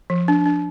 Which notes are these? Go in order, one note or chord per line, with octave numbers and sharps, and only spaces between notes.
F3
D4
D4